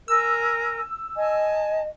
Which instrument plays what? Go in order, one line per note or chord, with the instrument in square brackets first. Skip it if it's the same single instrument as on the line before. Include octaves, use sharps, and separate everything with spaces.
[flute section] A#4 G#5 [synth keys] E6
[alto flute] D#5 [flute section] G#5 A5